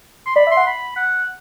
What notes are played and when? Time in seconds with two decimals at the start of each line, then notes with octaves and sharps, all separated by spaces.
0.26 C6
0.36 D5 B5
0.47 E5
0.51 C6
0.57 F#5
0.67 B5
0.96 F#5